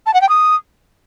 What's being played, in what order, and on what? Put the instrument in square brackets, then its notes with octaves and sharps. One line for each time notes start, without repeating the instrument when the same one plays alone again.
[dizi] A5
F#5
G5
D#6